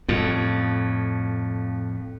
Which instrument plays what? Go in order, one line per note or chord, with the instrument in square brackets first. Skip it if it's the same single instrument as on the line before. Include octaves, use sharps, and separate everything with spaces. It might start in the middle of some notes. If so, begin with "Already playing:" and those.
[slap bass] F2 A2